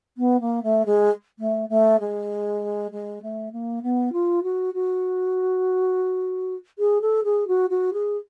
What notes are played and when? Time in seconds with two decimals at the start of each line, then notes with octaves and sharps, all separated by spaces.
0.18 B3
0.41 A#3
0.63 A3
0.86 G#3
1.39 A3
1.69 A3
2.00 G#3
2.92 G#3
3.22 A3
3.52 A#3
3.83 B3
4.13 F4
4.43 F#4
4.74 F#4
6.79 G#4
7.02 A4
7.24 G#4
7.48 F#4
7.70 F#4
7.93 G#4